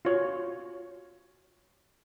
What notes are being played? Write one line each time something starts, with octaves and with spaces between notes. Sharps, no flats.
F4 F#4 C#5